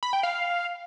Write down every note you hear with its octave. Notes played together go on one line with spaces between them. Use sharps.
B5
G5
F5